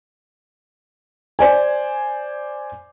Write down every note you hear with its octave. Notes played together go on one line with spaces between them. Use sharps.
C5 D5 G#5